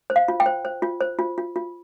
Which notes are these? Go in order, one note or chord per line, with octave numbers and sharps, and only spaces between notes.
C5
F5
F4
G5
C5
C5
F4
C5
F4
F4
F4